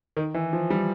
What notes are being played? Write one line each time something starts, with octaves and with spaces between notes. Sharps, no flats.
D#3
E3
F3
G3